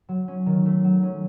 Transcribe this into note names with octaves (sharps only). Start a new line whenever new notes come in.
F#3
C#4
D#3
A3
F#3
C#4